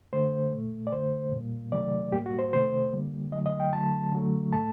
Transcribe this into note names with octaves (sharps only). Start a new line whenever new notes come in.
D3 A3 C5
A#2 A3
D5
D3 A3 C5
A#2 G3 A#3
C3 D#3 F#3 A3 D5
A2 G3 A#3 G4
F#4
C5
C3 D#3 A3 C5
D3 G3 A#3
D3 F#3 A3 D#5
D#5
G5
D3 F#3 A3 A5
D3 F#3 A3
A2 A3 A5